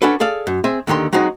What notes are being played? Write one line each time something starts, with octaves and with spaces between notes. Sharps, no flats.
C#4 D4 F#4 A4 B4
G#4 A4 D5 F5
F#2
C4 G#4 E5 G#5
D#2 D3 D#3 G4 C6
F#3 G#3 C4 D#4 F#4